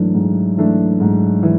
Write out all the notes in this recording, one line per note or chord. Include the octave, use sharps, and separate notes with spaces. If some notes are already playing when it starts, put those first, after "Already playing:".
Already playing: G#2 E3 F#3 A3 D4
G#2
E3 A3 D4
G#2
E3